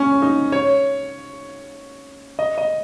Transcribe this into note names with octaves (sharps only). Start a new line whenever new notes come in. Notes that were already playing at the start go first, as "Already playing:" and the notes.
Already playing: C#4
D#4
C#5
D#5
D#5